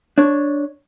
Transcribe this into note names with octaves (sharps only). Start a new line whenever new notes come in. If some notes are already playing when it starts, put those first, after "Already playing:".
D4 C#5